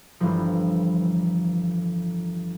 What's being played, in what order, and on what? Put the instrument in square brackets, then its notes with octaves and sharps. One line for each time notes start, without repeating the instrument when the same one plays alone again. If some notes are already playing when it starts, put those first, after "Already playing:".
[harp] G1 E3 F3